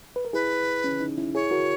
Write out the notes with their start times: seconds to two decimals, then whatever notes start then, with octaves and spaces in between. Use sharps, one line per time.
0.16 B4
0.25 A#4
0.33 E4 G#4 B4
0.84 C#4
1.00 D#4
1.18 C#4 E4
1.35 E4 G#4 C#5
1.51 F#4 A#4